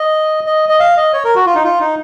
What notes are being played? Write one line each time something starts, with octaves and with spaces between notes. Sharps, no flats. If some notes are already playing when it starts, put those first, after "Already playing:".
Already playing: D#5
D#5
D#5
F5
D#5
C#5
A#4
F#4
F4
D#4
F4
D#4